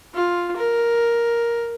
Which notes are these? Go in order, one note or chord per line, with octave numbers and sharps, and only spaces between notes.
F4
A#4